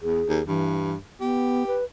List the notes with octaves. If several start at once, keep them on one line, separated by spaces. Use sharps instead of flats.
E2 G#4
D#2
G2 E3
B3 G4
B4